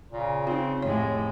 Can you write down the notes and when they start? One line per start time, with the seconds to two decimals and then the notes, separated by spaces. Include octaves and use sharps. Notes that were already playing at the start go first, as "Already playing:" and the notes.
0.12 A#2 C#3
0.47 C4 D#4 F4
0.83 F2 A2 C3 G#3 C#5